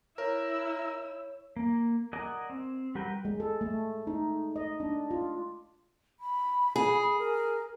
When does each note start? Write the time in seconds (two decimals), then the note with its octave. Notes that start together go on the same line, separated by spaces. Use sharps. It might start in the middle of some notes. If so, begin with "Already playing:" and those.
0.18 E4 A#4 C#5 E6
1.56 A#3
2.13 A#4 D5 D#5 F#5 G#5
2.50 C4
2.95 G3 F#4 A#4 B4 G5
3.25 G#3
3.40 A4
3.61 A3
4.07 D#4
4.56 D#5
4.80 D4
5.11 F4
6.20 B5
6.76 G#4
7.19 A#4